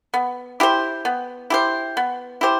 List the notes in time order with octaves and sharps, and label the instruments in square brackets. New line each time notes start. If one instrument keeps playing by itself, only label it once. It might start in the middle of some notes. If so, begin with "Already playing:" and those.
[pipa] B3
E4 G4 C5
B3
E4 G4 C5
B3
E4 G4 C5